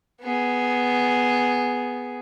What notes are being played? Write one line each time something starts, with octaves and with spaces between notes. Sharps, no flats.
B3 G#4